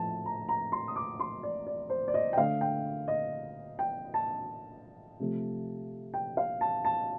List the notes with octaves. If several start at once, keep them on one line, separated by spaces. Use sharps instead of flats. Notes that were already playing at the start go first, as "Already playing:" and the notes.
Already playing: A2 F3 A3 A5
A#5
A#5
C6
D#6
D6
C6
D5
D5
C5
D5
D#5
G5
D3 A3 F5
G5
D#5
G5
A5
C3 F3 A3
G5
F5
A5
A5